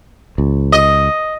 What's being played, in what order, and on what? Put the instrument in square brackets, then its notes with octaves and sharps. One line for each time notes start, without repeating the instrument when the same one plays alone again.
[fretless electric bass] C#2
[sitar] D#5